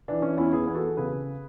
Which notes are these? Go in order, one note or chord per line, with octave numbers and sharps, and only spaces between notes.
E3 D4
E3 C#4
E2 C#4 E4
E3 E4 G#4
E2 B4
F#4 A4
E2
C#3 G#4 B4
C#3